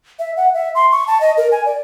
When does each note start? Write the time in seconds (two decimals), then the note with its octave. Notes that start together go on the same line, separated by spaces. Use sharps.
0.19 E5
0.37 F#5
0.54 E5
0.75 C6
0.92 C#6
1.07 A5
1.21 D#5
1.37 A#4
1.52 G#5
1.65 D5